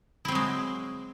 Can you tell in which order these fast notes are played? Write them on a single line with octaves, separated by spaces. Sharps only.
E4 C4 F#3 G#3